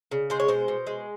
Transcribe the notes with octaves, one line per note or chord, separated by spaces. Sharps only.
C#3
G#3 C5
C#5
B2 C5
B2
G#3